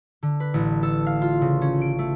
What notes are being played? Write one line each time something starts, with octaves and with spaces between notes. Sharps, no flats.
D3
B4
A1
A4
F5
F4
C#3
C#4
D7
A3